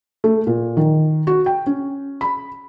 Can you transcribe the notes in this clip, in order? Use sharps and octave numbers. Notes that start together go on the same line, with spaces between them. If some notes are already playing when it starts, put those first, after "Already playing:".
A3
A#2
D#3
F#4
G5
C#4
B5